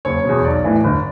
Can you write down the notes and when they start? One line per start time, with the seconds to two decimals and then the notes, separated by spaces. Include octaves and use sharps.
0.05 F#1 C#5
0.25 E2 B2
0.44 B1 D5
0.64 A2 E3
0.84 G1